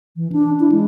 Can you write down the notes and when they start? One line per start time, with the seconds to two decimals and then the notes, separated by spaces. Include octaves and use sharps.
0.16 E3
0.32 D4
0.60 E4
0.72 G#3